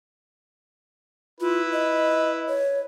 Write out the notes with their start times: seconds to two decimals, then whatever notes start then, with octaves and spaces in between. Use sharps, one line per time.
1.40 E4 F4 B4
1.73 D#5
2.48 C#5